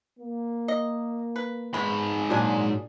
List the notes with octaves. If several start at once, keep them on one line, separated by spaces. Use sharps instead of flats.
A#3
D#5
B4
G#2 G#3 B3 B5
A#2 F#3 D4 G#4 G#5